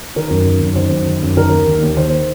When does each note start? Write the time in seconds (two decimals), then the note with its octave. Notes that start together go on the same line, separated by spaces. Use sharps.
0.16 D#3 A#4
0.30 F#2
0.46 D#3
0.61 F#2
0.76 D#3 C5
0.91 F#2
1.07 D#3
1.22 F#2
1.37 D#3 A#4
1.52 D#2
1.66 D#3
1.82 D#2
1.97 D#3 C5